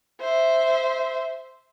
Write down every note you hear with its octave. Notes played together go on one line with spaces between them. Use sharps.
C5 E5